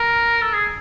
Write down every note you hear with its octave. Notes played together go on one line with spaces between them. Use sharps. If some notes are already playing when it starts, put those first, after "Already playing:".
Already playing: A#4
A4
G#4